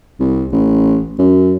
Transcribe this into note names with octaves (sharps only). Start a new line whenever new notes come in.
C2
A1
F#2